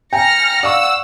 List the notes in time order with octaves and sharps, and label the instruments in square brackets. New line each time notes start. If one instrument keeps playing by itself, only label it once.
[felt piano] G5 G#5 A#5 [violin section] F6 A#6 C#7
[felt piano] D5 F5 C#6 [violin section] F#5 E6